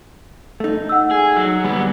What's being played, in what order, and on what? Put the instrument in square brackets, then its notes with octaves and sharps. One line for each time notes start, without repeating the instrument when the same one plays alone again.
[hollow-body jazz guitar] A3 D#4
[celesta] F#5 E6
[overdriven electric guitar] G#4
F#3
[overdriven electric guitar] D2 B3 [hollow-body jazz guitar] G3